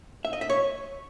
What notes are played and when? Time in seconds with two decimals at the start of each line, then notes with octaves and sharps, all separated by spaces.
0.25 E5
0.33 D#5
0.41 E5
0.50 C#5